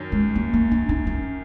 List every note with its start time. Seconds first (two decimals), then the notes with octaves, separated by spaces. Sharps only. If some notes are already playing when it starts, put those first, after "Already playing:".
Already playing: F#2 D#3 C#4
0.12 G#3
0.35 A#3
0.54 A#3
0.71 C#4
0.89 D#4
1.07 C#4